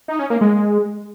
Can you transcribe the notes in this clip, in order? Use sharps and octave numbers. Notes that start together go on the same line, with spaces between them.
D#4
C#4
A#3
G#3